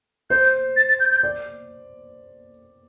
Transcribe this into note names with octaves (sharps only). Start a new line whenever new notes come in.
C5 G6
A6
A6
G6
G6
D5